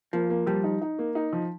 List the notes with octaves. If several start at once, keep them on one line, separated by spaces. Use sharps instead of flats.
F3 A#3
A#3
F3 G3
D#4
D#4
A#3
D#4
F3